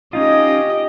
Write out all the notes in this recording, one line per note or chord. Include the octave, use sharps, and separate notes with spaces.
C#4 D#4 F4 G4 D#5